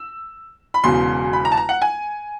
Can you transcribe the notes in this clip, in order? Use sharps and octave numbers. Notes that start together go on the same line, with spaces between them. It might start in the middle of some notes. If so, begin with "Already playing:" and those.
Already playing: E6
B5
E1 E2 C#3 F#3 C6
B5
A#5
A5
A#5
F#5
G#5